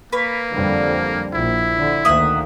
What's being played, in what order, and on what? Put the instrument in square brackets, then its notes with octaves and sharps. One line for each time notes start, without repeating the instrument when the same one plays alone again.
[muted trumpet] A#3 [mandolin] B4 C#5
[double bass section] F2 D3 G3
[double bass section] A#1 [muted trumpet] E4
[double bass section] D3
[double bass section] D2 D#3 A#3 [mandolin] E5 F#5 D#6